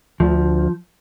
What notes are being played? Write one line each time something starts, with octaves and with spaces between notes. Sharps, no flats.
D2 F3